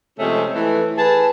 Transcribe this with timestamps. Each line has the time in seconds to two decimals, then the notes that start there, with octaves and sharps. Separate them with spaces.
0.19 C3 F3 G#3 A3 C#4
0.54 E3 A3
0.98 G#4 B4 A5